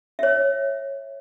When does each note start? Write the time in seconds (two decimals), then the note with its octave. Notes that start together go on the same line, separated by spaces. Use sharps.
0.19 C#5 E5